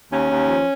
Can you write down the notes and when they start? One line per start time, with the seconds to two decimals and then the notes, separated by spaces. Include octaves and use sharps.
0.10 D#2 C#4
0.29 D#2
0.47 F3